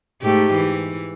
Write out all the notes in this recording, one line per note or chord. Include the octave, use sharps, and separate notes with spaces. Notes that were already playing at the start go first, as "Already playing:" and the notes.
G#2 A3 G4
E3